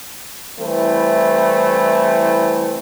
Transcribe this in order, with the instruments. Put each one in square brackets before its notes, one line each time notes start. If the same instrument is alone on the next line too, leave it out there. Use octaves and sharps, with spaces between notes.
[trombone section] E3 G3 A3 C4 E4